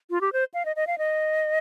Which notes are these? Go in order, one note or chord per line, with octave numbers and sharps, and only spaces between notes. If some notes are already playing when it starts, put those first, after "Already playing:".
F4
G4
C5
F5
D#5
D#5
F5
D#5